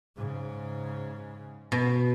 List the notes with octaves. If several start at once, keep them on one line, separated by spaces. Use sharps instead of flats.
G#2 C#3
B2